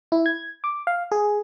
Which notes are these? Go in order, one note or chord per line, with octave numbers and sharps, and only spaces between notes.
E4
G#6
D6
F5
G#4